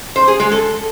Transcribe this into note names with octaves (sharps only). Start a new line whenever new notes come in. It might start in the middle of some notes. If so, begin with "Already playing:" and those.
C5
G#4
G#3
A4